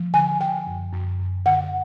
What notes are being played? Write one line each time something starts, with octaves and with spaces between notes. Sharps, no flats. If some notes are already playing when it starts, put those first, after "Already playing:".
Already playing: F3
D3 G#5
D3 G5
F#2
F#2
F#2
D3 F#5